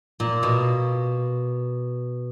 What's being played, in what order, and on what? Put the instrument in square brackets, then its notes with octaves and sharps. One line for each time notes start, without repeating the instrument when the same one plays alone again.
[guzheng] A#2
B2